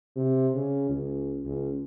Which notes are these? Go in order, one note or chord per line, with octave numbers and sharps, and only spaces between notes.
C3
C#3
C#2
C#2